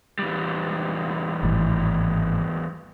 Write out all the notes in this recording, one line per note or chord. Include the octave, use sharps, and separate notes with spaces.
E2 G3
G#1 A2 E3